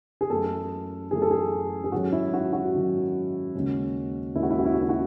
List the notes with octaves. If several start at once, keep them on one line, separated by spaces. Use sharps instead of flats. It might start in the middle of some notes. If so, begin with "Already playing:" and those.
G#4
F#2 E3 A3 A4
F#2 E3 A3 G#4
A4
G#4
G#4
G#2 D#3 F#3 C#4 F#4
E4
F#4
F#4
G#2 D#3 F#3 C#4
D#2 C#3 G#3 C#4
D#2 C#3 G#3 C#4 E4
F#4
E4
F#4
E4
F#4
E4
F#4